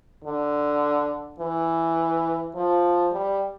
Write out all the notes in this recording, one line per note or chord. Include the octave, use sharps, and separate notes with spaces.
D3
E3
F3
G3